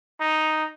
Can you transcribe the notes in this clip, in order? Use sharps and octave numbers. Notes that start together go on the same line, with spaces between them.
D#4